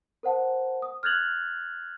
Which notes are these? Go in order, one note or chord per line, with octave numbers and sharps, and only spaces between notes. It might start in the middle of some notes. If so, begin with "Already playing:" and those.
A#4 C5 F#5 A5
D#6
F6 F#6 G#6 A6 F7 F#7